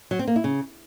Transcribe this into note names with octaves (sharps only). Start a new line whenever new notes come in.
F#3
C4
A#3
E4
C#3